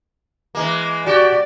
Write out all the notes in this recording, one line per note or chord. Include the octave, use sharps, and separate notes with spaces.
E3 G#3 A#3
F#4 G4 D5